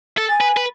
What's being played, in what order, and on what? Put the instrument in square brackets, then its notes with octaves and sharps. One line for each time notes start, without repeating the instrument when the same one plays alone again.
[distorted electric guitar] A4
[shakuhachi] G#5
[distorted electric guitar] B4
B4